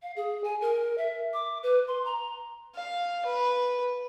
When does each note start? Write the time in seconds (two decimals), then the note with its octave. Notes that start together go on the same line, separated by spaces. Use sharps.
0.02 F5
0.16 G#4
0.44 G#5
0.61 A#4
0.98 E5
1.34 D6
1.63 B4
1.88 C6
2.05 A#5
2.75 F5
3.25 B4